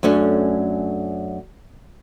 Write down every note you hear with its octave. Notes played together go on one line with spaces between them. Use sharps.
F#2 A3 C#4 D4